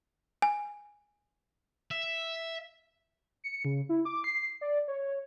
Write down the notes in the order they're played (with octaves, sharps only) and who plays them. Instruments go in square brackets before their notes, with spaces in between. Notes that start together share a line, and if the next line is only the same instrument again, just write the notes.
[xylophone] G#5
[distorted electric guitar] E5
[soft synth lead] C#7
C#3
E4
D6
C7
D5
C#5